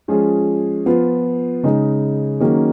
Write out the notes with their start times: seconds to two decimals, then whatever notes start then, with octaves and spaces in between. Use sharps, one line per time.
0.08 F3 G#3 C#4 F4 G#4
0.86 F3 B3 F4
1.63 C#3 G#3 D#4 G#4
2.40 D#3 F#3 A#3 C#4 G#4